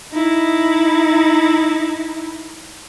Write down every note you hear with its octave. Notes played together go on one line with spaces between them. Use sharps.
D#4 E4